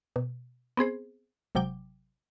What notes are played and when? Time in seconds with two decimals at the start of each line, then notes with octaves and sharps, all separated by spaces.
0.16 B2
0.77 B3 C4 G#4 C5
1.55 G#1 C3 F#3 G5 D6